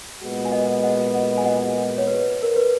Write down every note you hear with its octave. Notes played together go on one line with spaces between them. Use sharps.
A#2 G#3 B3 F#4
G#5
D#5 F#5
D#5 F#5
D#5 F#5
G#5
D#5 F#5
C#5
B4
A#4
B4